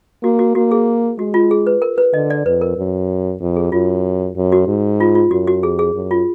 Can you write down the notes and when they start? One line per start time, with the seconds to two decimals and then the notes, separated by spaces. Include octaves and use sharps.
0.23 A#3 F#4
0.39 F#4
0.55 A#3 F#4
0.72 G#4
1.18 G#3 F#4
1.34 F4
1.51 G#4
1.67 B4
1.82 A#4
1.98 B4
2.14 D3 D#5
2.30 D5
2.46 F2 B4
2.61 A#4
2.77 F#2
3.40 F2
3.57 G#4
3.72 F#2 F4
4.36 F#2
4.52 F#4
4.67 G#2
5.00 F4
5.15 F4
5.31 F#2 F#4
5.48 F#4
5.63 F2 G#4
5.79 G#4
5.94 F#2
6.11 F4